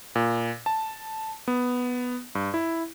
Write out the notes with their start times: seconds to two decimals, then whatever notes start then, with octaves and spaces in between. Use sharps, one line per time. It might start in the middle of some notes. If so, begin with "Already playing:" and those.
0.16 A#2
0.66 A5
1.48 B3
2.35 G2
2.54 E4